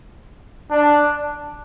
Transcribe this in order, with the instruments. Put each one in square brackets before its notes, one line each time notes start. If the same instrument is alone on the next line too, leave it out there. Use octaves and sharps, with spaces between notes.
[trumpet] D4